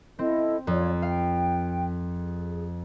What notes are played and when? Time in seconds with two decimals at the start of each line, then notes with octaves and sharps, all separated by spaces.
0.19 C4 E4 A4 D#5
0.67 F2 F4 C#5 D5
1.02 F5 G5
2.18 G#4